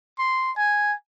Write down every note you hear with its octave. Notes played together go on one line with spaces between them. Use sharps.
C6
G#5